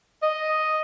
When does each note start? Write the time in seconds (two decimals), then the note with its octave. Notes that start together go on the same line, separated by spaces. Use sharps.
0.23 D#5